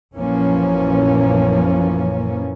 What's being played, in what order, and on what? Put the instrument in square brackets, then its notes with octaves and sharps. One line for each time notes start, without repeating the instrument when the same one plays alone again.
[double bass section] A#1 F#2 E3 F3 A#3 C#4